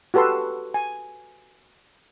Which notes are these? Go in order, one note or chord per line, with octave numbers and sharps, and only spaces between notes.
F#4 G4 A4 B4 C6
G#5